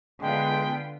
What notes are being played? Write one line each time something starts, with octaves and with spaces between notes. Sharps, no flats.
D3 G#3 B3 F4 B4 G5